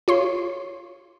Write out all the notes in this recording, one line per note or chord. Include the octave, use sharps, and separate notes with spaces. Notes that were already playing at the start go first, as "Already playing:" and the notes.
F4 C#5 C6